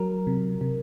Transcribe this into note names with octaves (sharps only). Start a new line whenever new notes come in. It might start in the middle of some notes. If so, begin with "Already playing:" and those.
Already playing: F#3 A#4
C3
C3